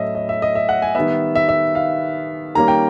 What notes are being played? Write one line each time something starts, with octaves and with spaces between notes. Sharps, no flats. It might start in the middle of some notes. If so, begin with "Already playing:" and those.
Already playing: A2 F#3 A3 C#4 D#5 E5
D#5
E5
D#5
E5
F#5
G#5
D#3 G3 B3 E5
E5
E5
F5
D#3 G3 A#3 C#4 A#5
G5